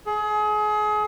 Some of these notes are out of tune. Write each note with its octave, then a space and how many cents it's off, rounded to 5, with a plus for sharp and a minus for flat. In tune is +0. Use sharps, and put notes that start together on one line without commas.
G#4 +30